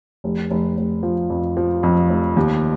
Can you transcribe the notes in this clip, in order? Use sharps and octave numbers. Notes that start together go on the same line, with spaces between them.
F1
F1
F1
F3
F2
F3
F2
F1
D#2